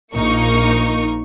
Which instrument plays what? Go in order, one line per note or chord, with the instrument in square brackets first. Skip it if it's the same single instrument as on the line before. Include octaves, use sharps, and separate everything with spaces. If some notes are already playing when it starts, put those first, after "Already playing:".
[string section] A#1 A#3 D#4 C#6